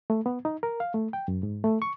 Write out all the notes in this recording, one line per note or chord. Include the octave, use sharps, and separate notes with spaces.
A3
B3
D#4
A#4
F5
A3
G5
F#2
G#2
A3
C#6